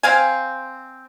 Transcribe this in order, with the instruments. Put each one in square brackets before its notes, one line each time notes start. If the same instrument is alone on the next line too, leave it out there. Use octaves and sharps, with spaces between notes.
[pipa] C4 F5 G#5